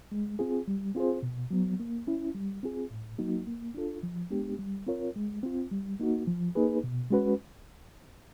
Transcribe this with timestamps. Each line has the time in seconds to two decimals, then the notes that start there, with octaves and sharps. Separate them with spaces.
0.12 G#3
0.39 C4 F4 G#4
0.68 G3
0.95 C4 F4 G#4 C5
1.22 B2
1.51 F#3 B3
1.80 A#3
2.07 C#4 E4
2.35 G3
2.63 C4 F4 G#4
2.90 A2
3.19 F#3 A#3 D#4 F#4
3.47 A#3
3.74 D4 F4 A4
4.03 F3
4.31 G#3 B3 D4 G4
4.59 G3
4.87 C4 F4 A#4 C#5
5.16 G#3
5.43 C4 F4
5.71 G3
6.00 A#3 D#4 F#4
6.27 F3
6.55 A#3 D#4 G#4 B4
6.84 B2
7.11 G#3 C#4 F#4 B4